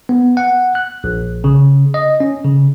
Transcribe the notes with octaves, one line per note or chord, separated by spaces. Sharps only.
B3
F#5
F#6
A#1
C#3
D#5
C#4
C#3